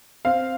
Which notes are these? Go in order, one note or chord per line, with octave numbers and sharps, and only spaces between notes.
C4 F5